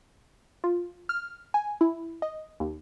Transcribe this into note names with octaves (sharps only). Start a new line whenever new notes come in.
F4
F6
G#5
E4
D#5
D#2